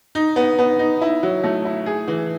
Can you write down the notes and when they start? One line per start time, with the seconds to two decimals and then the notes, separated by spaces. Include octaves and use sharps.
0.15 D#4
0.36 B3
0.59 B3
0.79 D#4
1.01 E4
1.23 F#3
1.44 A3
1.65 E4
1.86 G#4
2.08 E3